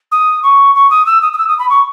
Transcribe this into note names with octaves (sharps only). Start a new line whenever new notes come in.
D#6
C#6
C#6
D#6
E6
D#6
D#6
E6
D#6
B5
C#6